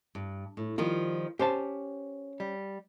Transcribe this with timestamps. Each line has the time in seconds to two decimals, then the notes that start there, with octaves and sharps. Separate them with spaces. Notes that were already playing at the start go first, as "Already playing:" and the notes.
0.15 G2
0.57 A2
0.78 D#3 F3 G3 F4
1.39 C#4 G4 C5 A5
2.40 G3